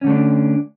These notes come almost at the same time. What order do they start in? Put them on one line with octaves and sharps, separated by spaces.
C#4 D3 A3 D4